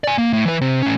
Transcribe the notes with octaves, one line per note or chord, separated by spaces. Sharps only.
D5 G#5
A#3
A2
E3 B4
C3
A2 C#4